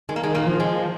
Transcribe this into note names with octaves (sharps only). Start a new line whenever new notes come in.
D#3 G#3
A#3
G#3
A#2 A#3
F3
G#3